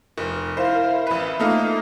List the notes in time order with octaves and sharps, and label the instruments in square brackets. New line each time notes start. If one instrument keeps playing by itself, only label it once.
[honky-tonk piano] F1 [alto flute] A#4
[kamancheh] E4 F5 [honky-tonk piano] C5
[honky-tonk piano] A1 B4 [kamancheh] E5
[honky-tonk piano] A3 D#4 F4 [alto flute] A#3